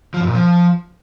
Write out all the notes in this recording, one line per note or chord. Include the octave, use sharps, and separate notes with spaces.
F3
F#2
A#2
F3